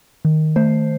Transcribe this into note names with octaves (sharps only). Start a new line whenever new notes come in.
D#3
A3 C5